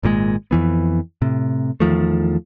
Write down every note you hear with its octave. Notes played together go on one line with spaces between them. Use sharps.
G#1 A#2 C#3 G#3
F2 E3 B3
A2 C3
E2 D#3 F3 A3